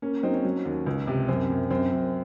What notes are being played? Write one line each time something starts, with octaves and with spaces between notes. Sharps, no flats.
A#3 C#4
F#3 C4 D#4
C#4
F#3
D#2
C#2
C3
F#2 C4
F#2
F#2 C4
F#2